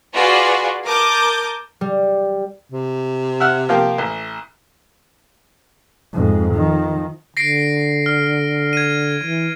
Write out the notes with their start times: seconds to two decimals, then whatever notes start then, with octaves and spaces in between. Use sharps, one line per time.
0.14 F4 F#4 G#4 B4 D5 C6
0.85 A#4 A5 D6 D#6 G6
1.81 G3
2.72 C3
3.40 E5 F#5 F6
3.69 F3 A#3 G4
3.98 A1
6.13 F2 G#2
6.54 D#3 F3
7.37 D3 A#6 C7 D7
8.06 F6
8.73 G#6 D#7
9.23 E3